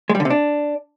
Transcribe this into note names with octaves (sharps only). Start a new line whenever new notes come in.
G#3
G3
D3
C3
D4